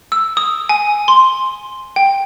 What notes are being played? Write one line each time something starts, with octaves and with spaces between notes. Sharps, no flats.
E6
D#6
G#5
C6
G5